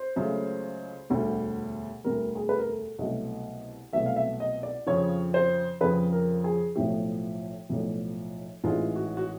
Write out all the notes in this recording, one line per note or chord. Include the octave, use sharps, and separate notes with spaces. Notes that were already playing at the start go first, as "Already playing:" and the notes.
Already playing: C5
C#2 C#3 F#3 A3
E1 D2 D3 G3
E1 D2 D3 G3 A#4
G#4
B4
A#4
A4
C2 B2 F#3 A3 D#5
C2 B2 F#3 A3 E5
F5
E5
D#5
D5
F2 C#3 F3 C#5
C5
F2 C#3 F3 B4
A#4
G#4
B1 A2 F3 A3 G4
B1 A2 F3 A3
A1 G#2 E3 G#3 F4
F#4
F#4